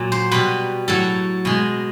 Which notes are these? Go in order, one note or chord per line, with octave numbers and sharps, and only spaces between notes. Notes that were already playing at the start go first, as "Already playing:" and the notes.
Already playing: A#2 F#3
C5
B2 G3 B4
A2 F#3 A4
B2 G#3